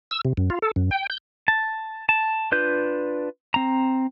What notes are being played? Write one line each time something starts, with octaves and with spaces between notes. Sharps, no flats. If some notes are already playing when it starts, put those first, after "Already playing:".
E6
C3
F#2
F4
A4
F#2
G5
G6
A5
A5
D4 F4 B4 G6
C4 A#5